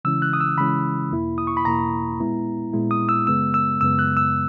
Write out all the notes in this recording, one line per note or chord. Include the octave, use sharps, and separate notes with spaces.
C#3 E3 G#3 C#4 E4 E6
F#6
D#6
E6
C#3 E3 G#3 C#4 E4 B5
E2 B2 A#3 E4
D#6
C#6
B5
E2 B2 A#3 E4 A#5
A#2 G#3 B3 E4
A#2 G#3 B3 E4
D#6
E6
F#2 C#3 G#3 B3 E6
E6
F#2 C#3 G#3 B3 E6
F#6
E6